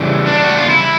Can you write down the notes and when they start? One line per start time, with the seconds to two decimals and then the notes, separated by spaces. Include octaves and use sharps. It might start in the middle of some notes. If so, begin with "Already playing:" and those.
Already playing: C#3 E3 G3
0.27 D4
0.44 F#4
0.57 F4
0.70 E4